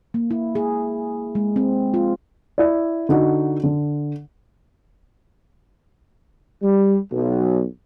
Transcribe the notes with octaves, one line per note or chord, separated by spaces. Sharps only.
A#3
E4
G#4
G#3
C4
F4
E4 D5
D3 D#4 F#4
D3
G3
B1